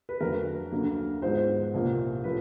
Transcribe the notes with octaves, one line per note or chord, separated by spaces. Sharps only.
B4
F2 D3 F#3 A3 A#4
D2 D3 F#3 A#3
G#2 F3 G#3 B3 C5
C2 A#2 F3 A#3
A2 F3 B4